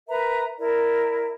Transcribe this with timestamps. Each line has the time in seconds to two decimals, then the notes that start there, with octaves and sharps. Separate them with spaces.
0.09 A#4 B4 E5 A#5
0.58 E4 A#4 D5